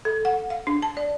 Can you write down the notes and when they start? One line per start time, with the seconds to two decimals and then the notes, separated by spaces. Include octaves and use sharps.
0.05 A4
0.25 F#5
0.50 F5
0.67 D4
0.82 A5
0.97 D5